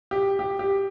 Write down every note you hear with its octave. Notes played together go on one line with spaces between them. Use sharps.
G4
G4
G4